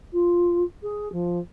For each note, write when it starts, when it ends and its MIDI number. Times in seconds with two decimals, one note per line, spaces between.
0.13 0.63 65
0.83 1.11 68
1.12 1.39 53